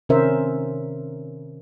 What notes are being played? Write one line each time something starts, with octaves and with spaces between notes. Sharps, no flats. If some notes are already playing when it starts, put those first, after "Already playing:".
C3 D#3 C#4 A#4 C5 E5